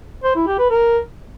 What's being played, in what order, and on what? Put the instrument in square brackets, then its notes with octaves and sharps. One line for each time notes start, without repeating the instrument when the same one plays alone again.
[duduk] C5
E4
G4
B4
A#4